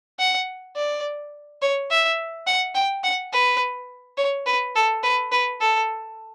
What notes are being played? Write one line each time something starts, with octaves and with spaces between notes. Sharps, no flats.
F#5
D5
C#5
E5
F#5
G5
F#5
B4
C#5
B4
A4
B4
B4
A4